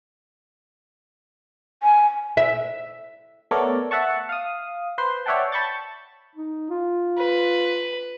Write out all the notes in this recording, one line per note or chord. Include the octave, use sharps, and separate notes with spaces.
G#5
E5
A3 B3 A4 A#4 C#5 D5
E5 F#5 A5 C#6
F5 D#6
B4 C5 C6
C#5 D5 E5 F#5 G5 A5
A5 B5 C#6 G6 A6
D#4
F4
B4